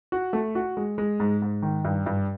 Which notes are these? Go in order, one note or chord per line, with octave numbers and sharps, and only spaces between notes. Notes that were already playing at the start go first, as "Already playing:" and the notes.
F#4
A3
F#4
G#3
G#3
G#2
G#2
D#3
G2
G2